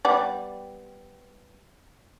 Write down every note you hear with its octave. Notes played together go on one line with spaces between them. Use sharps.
G3 B3 D5